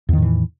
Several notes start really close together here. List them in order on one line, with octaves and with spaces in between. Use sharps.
E2 D#3 A2 E3